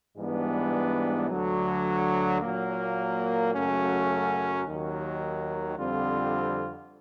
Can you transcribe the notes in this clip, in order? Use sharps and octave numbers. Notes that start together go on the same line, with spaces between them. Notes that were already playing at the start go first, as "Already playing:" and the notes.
G#2 E3 G3 B3 D4
D2 D3 F#3
A#2 F#3 A#3
F#2 C#3 F#3 A3 C#4
D#2 D#3 F#3
F2 D3 G3 C4 F4